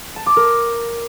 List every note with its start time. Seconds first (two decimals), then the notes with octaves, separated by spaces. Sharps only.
0.16 A5
0.26 D6
0.36 A#4